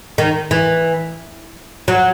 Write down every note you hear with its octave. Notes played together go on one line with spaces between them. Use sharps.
D#3
E3
F#3